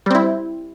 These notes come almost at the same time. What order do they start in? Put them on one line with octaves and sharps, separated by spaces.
G3 C4 E4